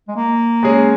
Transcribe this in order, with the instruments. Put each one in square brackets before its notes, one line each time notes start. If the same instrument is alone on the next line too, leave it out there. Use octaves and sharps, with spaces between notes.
[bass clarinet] G#3
A#3
[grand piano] G#3 C#4 G#4 C#5